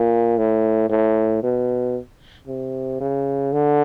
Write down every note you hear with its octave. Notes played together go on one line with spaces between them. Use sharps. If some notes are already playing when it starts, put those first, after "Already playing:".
Already playing: A#2
A2
A2
B2
C3
C#3
D3